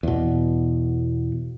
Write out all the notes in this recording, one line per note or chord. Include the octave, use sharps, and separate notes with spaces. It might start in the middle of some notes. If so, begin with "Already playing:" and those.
E2 B2